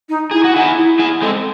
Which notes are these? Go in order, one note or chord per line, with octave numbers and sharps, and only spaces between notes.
D#4
E4 G#4
F#4
D#4 E4 G#4
E4
E4 G#4
G#3 C4 A4